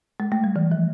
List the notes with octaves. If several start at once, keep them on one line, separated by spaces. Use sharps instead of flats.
G#3
A3
G3
E3
F3